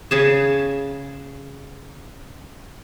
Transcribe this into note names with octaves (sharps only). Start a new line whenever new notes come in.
C#3 G#4 A5